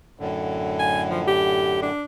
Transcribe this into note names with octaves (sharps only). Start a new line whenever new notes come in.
F#2 A2 D3
G#5
F3
G4
D4